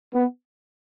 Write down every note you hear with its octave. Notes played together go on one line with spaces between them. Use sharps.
B3